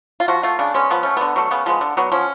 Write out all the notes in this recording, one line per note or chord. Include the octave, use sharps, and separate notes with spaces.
F4
F3 F#4
A3 F4
C#3 D4
G#3 B3 C#4
F3 B3
A3 C#4
D3 B3
F#3 A3
C#3 B3
F3 G#3 B3
D3
F#3 B3
F3 C#4